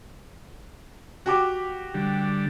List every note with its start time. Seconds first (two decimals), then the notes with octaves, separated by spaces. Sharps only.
1.26 F#4 G4 D6
1.94 D3 G3